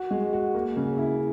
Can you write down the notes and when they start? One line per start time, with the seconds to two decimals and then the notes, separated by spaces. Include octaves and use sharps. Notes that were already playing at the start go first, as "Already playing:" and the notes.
Already playing: F#4
0.11 G#3
0.33 F#4
0.55 A#3
0.77 C#3
0.98 E4